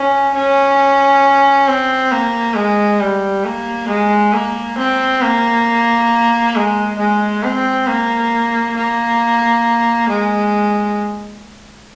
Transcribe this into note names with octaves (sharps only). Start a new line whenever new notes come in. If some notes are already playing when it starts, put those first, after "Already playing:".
Already playing: C#4
C#4
C4
A#3
G#3
G3
A#3
G#3
A#3
C4
A#3
G#3
G#3
C4
A#3
A#3
G#3